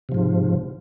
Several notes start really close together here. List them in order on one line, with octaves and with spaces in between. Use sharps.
C3 F3 G#2